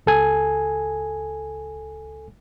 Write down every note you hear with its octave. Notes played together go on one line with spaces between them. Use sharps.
C#2 A4 G#5